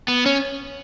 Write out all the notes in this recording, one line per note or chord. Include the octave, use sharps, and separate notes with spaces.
B3
C#4